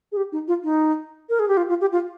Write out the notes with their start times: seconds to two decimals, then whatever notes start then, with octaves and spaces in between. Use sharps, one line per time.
0.12 G#4
0.17 G4
0.32 D#4
0.48 F4
0.64 D#4
1.29 A#4
1.39 G#4
1.48 G4
1.57 F4
1.69 F4
1.81 G4
1.92 F4